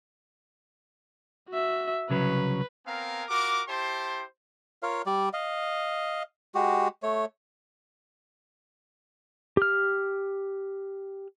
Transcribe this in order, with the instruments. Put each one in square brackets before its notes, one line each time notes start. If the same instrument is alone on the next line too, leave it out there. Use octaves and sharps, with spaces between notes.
[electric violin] F#4 E5
[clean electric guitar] C2 C#3 F#3 [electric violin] B4
[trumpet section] B3 C4 A#4 F5 G#5 A#5
F4 F#4 A#4 D6
E4 G4 C5 A5 C6
[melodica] F4 A#4 C#5 F5
G3 D5
D#5 F5
G#3 F#4 G4
A3 C#5
[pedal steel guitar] G4 F6